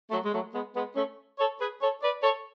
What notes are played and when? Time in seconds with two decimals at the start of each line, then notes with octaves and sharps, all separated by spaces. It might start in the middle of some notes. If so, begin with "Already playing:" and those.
0.11 F#3 A3
0.24 G#3
0.32 F#3 A3
0.53 G#3 B3
0.75 G#3 B3
0.96 A3 C#4
1.38 A4 C#5
1.59 G#4 B4
1.81 A4 C#5
2.03 B4 D5
2.22 A4 C#5